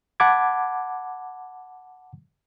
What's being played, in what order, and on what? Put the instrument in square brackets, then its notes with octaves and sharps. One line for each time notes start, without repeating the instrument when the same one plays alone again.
[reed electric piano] F#5 A5 B5 D6 G#6